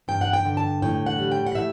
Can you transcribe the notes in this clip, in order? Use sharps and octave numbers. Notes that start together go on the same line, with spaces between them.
G2 G5
F#5
G5
D3
A5
A2 G5
F#5
G3
G5
F#5
A2 E5